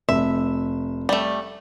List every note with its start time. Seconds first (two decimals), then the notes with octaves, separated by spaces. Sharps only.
0.09 F1 E5
1.09 G3 A3